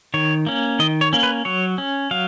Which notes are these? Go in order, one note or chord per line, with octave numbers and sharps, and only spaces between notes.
D#3 C#5
A#3 C#4
D#3 D#5
C#5
A#3 C#4
B4
F#3 C#5
C#4
F#3 F5